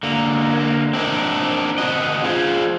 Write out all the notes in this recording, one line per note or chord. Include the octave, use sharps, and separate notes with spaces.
D3 A#3
C4 D4 D#4 A#4
C4 F#4 D#5
F4 G#4 C5